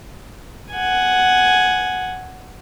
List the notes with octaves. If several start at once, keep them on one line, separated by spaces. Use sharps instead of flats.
F#5 G#5